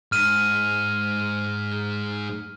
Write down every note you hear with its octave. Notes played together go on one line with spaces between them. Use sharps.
G#2 F6 D#7